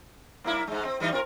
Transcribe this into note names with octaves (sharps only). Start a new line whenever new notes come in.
G2 A#3 E4
G#2 G#3
C4
E3 G3 D#4
C4 F4 A#4